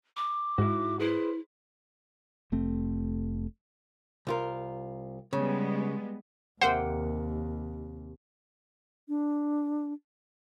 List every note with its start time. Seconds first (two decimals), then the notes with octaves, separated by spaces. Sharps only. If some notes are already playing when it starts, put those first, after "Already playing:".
0.17 D6
0.58 G#2 E4 F#4
0.99 E4 G#4 B4 C5
2.52 F1 A3 C4
4.27 C2 F4 A#4
5.33 C#3 G3 G#3 B3
6.61 D#2 C3 A#3 C5 F#5 G5
9.08 D4